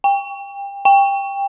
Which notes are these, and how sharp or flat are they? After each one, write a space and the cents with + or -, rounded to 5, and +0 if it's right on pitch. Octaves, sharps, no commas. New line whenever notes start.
G5 +30
G5 +20